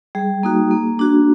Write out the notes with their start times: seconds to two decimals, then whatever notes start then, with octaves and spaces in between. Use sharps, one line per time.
0.15 G3 G#4
0.43 A#3 D#4 F#4
0.71 A#3
0.99 D4 F#4